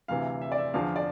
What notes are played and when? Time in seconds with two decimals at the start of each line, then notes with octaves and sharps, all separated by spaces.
0.08 D2 C3 E3 F5
0.41 E5
0.52 D5
0.58 E5
0.74 E2 D3 F3 F5
0.96 D5